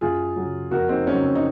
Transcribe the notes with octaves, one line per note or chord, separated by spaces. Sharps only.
F#2 F4 G#4
C#3 F#3
F2 F#4 A#4
C4 D#4
C#3 F#3 C#4
C4
D#4